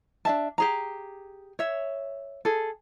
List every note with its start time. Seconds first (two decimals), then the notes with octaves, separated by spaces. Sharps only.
0.25 D4 E5 A5
0.58 G4 G#4 A#5
1.59 C#5 E5
2.45 G#4 A4